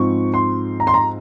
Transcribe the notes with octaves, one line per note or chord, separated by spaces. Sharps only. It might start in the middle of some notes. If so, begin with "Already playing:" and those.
Already playing: G#2 F3 C4 C#6
C6
A#5
C6
A#5